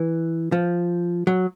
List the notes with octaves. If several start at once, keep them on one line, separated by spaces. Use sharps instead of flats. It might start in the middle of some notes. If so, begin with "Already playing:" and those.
Already playing: E3
F3
F#3